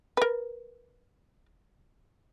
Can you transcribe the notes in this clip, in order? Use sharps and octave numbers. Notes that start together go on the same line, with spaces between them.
A#4 B4